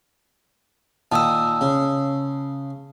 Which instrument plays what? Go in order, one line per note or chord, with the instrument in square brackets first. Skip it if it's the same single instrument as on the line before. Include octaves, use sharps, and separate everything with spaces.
[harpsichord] A#2 D#3 [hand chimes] A5 D#6 E6
[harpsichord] C#3